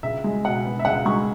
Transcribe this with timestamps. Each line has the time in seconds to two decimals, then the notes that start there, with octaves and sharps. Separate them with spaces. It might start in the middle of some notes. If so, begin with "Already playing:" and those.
0.03 C#2 E5
0.24 G#3
0.45 B2 F#5
0.65 B3
0.79 E5
0.85 C#2 F#5
1.05 G#3 C#6